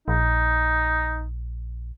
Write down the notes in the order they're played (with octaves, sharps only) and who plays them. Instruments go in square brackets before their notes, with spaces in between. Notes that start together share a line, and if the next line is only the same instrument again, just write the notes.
[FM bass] A#1 [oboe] D#4